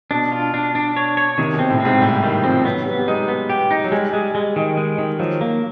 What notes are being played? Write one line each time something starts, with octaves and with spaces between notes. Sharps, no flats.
B2 D4
F4
D4
D4
C#5
C#5
C3 D#3
B2 C4
A2
C4
G#2
A2 G3
D#3 G3
F3 C4
F#3 B3
G3 B3
G3
G#3 D#4
B3
G4
D#4
F#3
G3 G#3
G#3
G#3
D#3
G#3
D#3
F3 F#3
A#3